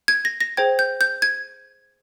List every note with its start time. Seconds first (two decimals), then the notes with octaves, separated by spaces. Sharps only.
0.08 G#6
0.25 A#6
0.40 A#6
0.57 G#4 C5 G5 G#6
0.79 G6
1.01 G6
1.22 G#6